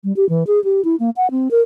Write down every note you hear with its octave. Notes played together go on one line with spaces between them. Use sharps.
G3
G4
E3
G#4
G4
E4
A#3
F#5
C4
A#4